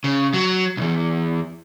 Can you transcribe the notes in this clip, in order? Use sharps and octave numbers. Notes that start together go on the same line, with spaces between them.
C#3
F#3
B1 E2